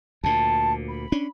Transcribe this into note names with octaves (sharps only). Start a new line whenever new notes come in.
D2 A#2 A5
B5
C#4 D4